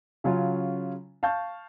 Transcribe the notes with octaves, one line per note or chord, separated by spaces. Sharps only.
C#3 F#3 C#4 F4
F5 A5 C#6 G6